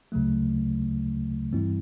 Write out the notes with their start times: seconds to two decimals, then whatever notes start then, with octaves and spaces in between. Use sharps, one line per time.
0.12 D2 C#3 F#3 A3
1.52 G2 E3 G3 C4 E4